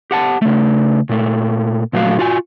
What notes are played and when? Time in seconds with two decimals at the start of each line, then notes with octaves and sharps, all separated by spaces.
0.11 G4 F#5 A5
0.42 C#3 A3
1.09 A#2 A3
1.93 A#2 F#3 A3 F#4 F5
2.19 F4 F#4 G#5